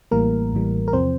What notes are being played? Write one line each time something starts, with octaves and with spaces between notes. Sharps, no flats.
A1 A2 E3 G3 A#3 A#4
A1 A2 E3 G3
A#4
E2 C3 F3 C4 C5